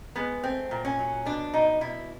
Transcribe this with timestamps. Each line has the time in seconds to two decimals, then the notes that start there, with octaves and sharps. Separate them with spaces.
0.16 G#3 B3
0.43 A3 C4
0.71 A#2
0.85 C#4
0.99 F#3
1.25 B2 D4
1.54 B2 D#4
1.81 B2 E4